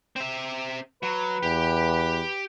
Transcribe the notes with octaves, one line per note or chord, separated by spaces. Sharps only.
C4 E5
F#3 B4
E2 G4